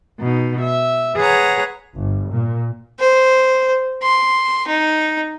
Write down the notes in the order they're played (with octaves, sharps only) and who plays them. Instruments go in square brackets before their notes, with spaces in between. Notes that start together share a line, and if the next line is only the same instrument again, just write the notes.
[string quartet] B2 D#4
E5
G#4 B4 C#5 F#5 A#5
[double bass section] G1
A#2
[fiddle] C5
C6
D#4